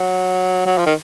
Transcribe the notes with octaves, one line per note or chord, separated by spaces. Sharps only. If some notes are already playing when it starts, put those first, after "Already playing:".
Already playing: F#3
F#3
F3
D#3